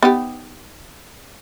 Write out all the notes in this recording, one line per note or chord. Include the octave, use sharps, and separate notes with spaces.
B3 D#4 G4